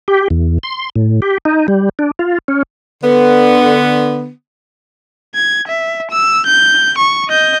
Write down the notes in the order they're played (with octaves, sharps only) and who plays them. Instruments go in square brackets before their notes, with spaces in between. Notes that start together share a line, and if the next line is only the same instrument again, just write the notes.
[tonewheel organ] G4
E2
C6
A2
G4
D#4
G3
D4
F4
C#4
[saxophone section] D3 B3
[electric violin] G#6
E5
E6
G6
C#6
D#5 G6